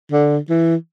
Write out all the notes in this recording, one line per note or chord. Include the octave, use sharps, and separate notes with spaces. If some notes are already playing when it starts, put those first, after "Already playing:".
D3
E3